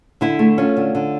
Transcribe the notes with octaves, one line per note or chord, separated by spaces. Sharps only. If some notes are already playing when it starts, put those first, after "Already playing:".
D3 E4
A3
C#4 F4
D3
D3